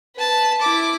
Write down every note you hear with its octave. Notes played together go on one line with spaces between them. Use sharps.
B4 A5
E4 D6